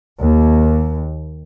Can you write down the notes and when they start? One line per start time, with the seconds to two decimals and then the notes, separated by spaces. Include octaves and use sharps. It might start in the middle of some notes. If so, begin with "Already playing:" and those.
0.22 D#2